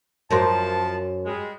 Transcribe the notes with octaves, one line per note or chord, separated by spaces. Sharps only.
F#2 F3 A#4 C5 A5
G3 G#3